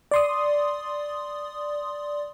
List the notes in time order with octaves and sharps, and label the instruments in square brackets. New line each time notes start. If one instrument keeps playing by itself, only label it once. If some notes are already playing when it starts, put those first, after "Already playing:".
[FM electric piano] D5 C6 D#6